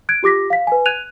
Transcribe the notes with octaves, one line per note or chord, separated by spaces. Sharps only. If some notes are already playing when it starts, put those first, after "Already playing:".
F#6 G#6 D7
F4 G4 D6 A#6 B6
F5 B6
B4 G#5
F#6 G#6 D#7 F7